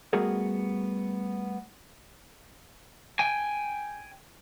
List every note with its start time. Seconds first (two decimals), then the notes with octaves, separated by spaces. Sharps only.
0.13 G3 A3 B3 F#4 G#4 A#4
3.19 G5 G#5